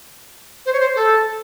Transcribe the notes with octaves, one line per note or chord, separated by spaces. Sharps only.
C5
C#5
C5
A4